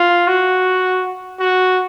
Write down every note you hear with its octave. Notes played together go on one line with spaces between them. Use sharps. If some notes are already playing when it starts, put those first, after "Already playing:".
Already playing: F4
F#4
F#4